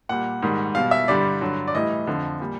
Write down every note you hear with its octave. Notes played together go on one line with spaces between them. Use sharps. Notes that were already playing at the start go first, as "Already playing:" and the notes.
A#2 G3 F#5
G#2 D#3 G3
B2 G3 F5
E5
G2 D3 G3 D5
G2 D3 F#3
D5
A2 E3 G3 D#5
F2 D3 F3
A#2 G3